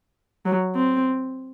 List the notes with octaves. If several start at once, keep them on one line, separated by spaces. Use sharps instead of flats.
F#3
C4